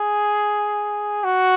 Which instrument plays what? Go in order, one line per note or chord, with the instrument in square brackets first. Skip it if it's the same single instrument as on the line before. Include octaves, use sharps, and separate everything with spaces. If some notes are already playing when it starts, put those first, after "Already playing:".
Already playing: [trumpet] G#4
F#4